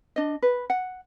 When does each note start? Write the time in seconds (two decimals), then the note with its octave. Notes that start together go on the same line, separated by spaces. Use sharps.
0.16 D4 D#5
0.42 B4
0.70 F#5